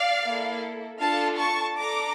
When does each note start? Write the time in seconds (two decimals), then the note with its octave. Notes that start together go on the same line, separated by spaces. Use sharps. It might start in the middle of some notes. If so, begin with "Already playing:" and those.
Already playing: D5 F5
0.24 A#3 E4 A4
1.00 D4 F4 A4 F5 A5
1.38 A5 C#6
1.77 D4 A4 A#5 D6